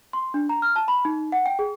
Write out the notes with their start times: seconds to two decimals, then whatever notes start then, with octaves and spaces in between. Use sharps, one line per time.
0.13 C6
0.34 D4
0.49 A#5
0.62 F6
0.76 A5
0.88 B5
1.05 D#4
1.32 F#5
1.46 G5
1.59 G#4